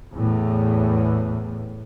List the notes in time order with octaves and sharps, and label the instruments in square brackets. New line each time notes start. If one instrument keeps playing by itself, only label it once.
[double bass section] E2 A2